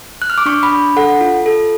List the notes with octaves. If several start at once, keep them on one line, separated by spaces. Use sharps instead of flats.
F#6
F6
D6
D4 C#6
B5
D4
A4 F#5
F4
A4